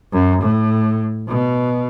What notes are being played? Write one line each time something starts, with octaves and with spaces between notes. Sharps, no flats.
F#2
A2
B2